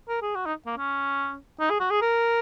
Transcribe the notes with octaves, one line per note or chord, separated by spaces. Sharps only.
A#4
G#4
F#4
D#4
A#3
C#4
D#4
G#4
F#4
G#4
A#4